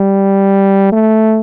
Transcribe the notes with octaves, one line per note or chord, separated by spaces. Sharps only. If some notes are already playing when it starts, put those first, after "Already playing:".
Already playing: G3
A3